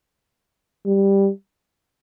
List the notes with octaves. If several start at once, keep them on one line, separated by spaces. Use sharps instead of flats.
G3